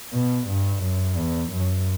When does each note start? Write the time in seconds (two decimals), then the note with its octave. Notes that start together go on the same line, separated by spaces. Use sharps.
0.13 B2
0.48 G2
0.83 F#2
1.17 E2
1.51 F#2